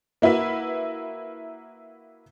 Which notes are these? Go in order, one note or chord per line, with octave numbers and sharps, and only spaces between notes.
A#3 E4 F#4 B4 E5